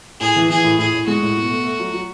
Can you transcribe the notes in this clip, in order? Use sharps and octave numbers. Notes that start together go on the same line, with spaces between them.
A2 G#4
E3
E3 G#4
A2
A2 G#4
A2
G#3 F#4
A2
B2
A3
A3
F#3
F#3